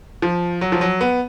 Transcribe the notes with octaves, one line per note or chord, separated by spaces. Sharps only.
F3
F#3
F3
F#3
B3